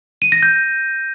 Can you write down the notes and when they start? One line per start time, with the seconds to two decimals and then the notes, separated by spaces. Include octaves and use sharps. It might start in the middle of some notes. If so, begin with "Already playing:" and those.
0.22 D#7
0.32 A#6
0.43 G6